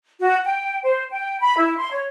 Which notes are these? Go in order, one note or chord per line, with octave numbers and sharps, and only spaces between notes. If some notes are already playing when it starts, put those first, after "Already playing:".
F#4
G5
C5
G5
B5
E4
C6
C#5